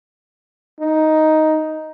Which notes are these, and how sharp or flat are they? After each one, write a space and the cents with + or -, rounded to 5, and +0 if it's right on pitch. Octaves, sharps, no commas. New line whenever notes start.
D#4 +5